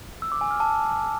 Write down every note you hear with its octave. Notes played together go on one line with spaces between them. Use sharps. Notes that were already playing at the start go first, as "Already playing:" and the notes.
E6
D6
G#5
F6
A5